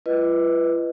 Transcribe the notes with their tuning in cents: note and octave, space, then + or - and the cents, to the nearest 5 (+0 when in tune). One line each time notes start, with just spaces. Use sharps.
F4 -40 B4 +0 D#5 +0